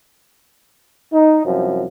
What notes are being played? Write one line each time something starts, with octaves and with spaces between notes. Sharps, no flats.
D#4
C2 F#2 F3